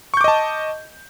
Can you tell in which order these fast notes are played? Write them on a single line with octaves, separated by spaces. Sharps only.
C#6 G6 D6 D#5 A5